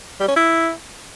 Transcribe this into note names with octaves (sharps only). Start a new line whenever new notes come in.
G3
C#4
E4